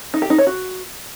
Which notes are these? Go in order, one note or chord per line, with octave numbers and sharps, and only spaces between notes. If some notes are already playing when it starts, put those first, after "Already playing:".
D#4
G4
D#4
C#5
F#4